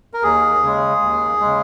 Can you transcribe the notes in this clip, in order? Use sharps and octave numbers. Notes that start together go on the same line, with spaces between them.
A#4
D#2 G#4
C#3 G#3
D#2
C#3 G#3